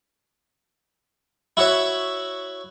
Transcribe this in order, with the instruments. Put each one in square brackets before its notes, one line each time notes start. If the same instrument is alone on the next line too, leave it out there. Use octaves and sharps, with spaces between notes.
[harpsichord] E4 F#4 C#5 E5